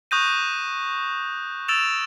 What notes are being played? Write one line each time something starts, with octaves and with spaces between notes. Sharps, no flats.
C#6 D#6 F#6 G6 A#6 D#7
E6 A6 D7 E7 F7